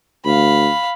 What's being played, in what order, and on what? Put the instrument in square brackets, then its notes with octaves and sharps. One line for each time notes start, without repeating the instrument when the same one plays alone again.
[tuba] D2 [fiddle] F5 B5